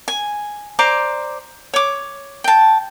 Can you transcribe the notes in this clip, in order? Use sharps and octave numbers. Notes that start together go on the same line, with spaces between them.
G#5
C5 D5 A#5 D6
C#5 D6
G5 A5